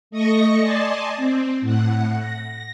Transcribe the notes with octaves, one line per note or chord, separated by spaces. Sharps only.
A3 D#5 C#6 D#6 A#6 C#7
D5 D#5 G#5 A5 C6 D6
C4
A2 F#5
A#6